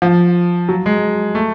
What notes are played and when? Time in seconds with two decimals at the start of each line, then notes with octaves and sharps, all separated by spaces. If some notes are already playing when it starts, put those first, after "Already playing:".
0.02 F3
0.69 F#3
0.86 G#3
1.35 A3